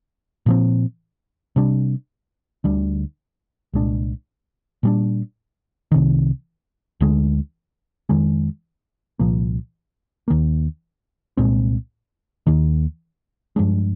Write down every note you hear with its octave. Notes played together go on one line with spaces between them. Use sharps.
A#2 F3 C4
C3 G3 D4
D2 D3 G3
C2 A#2 G#3 D4
A#2 G3 D4
C2 C3 D#3
D2 D3 G#3
F2 D#3 G#3
C2 A#2 F3 A#3
D#2 D#3 A#3
C2 A#2 G#3 C4
D#2 D#3 A#3
G2 F3 G#3 D4